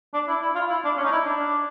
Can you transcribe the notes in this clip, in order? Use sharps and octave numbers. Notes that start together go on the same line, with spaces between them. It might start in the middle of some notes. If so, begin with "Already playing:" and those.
D4
E4
E4
F4
E4
D4
C#4
D#4
E4
D4